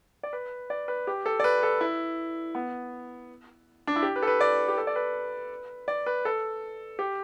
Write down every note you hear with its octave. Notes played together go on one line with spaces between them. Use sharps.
D5
B4
D5
B4
G4
A4
D5
B4
A4
E4
B3
D4
E4
G4
B4
A4
B4
D5
G4
A4
D5
B4
D5
B4
A4
G4